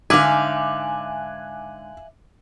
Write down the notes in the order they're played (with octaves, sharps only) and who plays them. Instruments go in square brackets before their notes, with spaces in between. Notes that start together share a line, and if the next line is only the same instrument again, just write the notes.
[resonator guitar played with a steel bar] G#2 D3 D#4 [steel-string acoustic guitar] E5 F5 [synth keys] G#5 F#6 [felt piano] D6